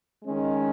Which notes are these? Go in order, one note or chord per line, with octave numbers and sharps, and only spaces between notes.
D#3 G#3 C#4